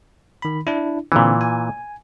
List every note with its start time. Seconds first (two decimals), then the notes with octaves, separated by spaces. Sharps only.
0.42 D#3 B5
0.67 D4 E4
1.12 A#2 D3 E3 C4
1.41 G#5